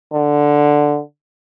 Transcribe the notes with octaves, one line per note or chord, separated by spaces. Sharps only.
D3